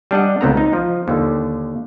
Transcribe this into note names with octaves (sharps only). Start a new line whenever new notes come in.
G3 D4 D#5 F#5
C#2 B3 C4 A4 A#5
D#4
F3
D#2 D3